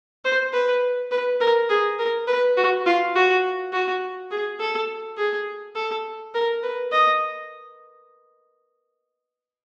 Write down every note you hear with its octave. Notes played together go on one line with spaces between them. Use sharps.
C5
B4
B4
A#4
G#4
A#4
B4
F#4
F4
F#4
F#4
G#4
A4
G#4
A4
A#4
B4
D#5